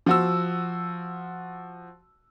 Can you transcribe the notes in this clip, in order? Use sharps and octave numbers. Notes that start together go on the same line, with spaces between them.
F3 F#4 E6